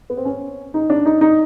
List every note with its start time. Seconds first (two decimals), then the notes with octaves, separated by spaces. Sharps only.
0.10 B3
0.17 C4
0.25 C#4
0.74 D#4
0.90 D4
1.06 D#4
1.21 D#4